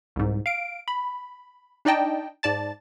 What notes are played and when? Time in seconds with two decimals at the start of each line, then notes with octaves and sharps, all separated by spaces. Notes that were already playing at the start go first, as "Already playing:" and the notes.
0.16 C2 G#2
0.46 F5 D7
0.88 B5
1.85 D4 D#4 D5 D#5 G5 A5
2.43 G#2 D5 A5 A6